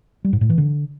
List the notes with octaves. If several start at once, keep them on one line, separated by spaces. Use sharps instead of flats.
G3
G#2
A2
E3
D3